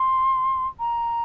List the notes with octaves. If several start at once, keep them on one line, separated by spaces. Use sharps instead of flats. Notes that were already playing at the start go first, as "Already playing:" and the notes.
Already playing: C6
A#5